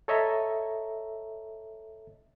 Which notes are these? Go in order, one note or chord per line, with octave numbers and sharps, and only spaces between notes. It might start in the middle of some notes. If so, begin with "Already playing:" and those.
A4 C#5 D#5 E5 A#5